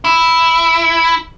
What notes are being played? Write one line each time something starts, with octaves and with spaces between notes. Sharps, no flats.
E4